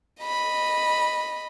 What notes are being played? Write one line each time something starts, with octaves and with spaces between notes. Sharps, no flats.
D#5 B5